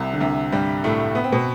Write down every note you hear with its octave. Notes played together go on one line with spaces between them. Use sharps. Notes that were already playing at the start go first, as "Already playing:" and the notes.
Already playing: C2 C3
D3
C2 C3
G2 G3
A2 A3
B3
C4
B2 B3